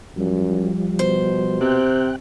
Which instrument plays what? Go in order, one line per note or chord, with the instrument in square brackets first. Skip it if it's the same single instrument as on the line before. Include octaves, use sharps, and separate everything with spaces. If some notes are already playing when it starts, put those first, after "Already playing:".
[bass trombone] F#2 [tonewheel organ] F3 G3
[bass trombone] B2 [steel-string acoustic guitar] C5
[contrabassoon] C3 [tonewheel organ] G5 F#6